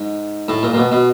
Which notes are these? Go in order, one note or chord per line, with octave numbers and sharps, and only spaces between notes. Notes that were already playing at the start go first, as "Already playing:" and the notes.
Already playing: G#2
A2
A#2
A#2
B2
B2